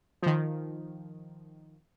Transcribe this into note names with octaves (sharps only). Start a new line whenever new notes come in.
D#3 F3